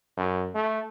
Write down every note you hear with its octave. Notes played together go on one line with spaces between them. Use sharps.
F#2
A3